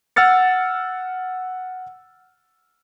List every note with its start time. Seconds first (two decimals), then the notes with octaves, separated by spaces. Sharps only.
0.16 F#5 E6 F6 A6 C#7